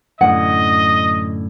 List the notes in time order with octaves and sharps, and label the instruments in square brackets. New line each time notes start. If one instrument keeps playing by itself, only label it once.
[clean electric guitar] F#2 A2 D3 [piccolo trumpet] D#5 [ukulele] F#5